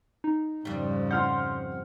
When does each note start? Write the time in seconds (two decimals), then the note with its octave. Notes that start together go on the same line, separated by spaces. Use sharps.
0.24 D#4
0.65 F2 G#2 C#3 G3
1.11 F#5 C6 F6 G6